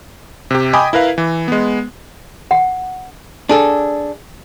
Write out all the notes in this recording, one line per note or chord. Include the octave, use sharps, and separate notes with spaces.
C3 G4
D#5 G5 G#5 B5 D6 D#6
E4 A#4 B4 F5
E3
G#3 B3
F#5
D4 G#4 A4